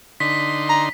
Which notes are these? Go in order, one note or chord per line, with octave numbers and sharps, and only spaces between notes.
D3 D#4 C6 B6
A#5